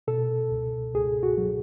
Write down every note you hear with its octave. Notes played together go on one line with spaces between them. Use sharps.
B2 A4
C#2
C#2 G#4
F#4
F#3